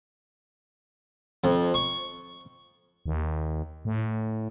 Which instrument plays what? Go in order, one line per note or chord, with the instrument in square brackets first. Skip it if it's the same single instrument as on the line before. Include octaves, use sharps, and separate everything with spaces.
[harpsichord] F2
C#6
[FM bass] D#2
A2